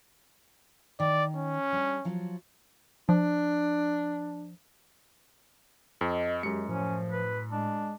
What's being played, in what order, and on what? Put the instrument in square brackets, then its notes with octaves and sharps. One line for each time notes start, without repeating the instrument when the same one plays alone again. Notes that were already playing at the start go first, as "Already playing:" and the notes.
[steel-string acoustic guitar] D#3 [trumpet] D5
[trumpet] C#4
[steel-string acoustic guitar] G3 D4
F3 F#3 F4
[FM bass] F3 [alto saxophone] D4
[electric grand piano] F2 [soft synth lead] D#5
[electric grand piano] F#2 C#7 [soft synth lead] G#3 [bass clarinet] G4
[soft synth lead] A2 [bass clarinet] F3 [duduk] C#4
[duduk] B4
[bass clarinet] G#3 [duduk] D4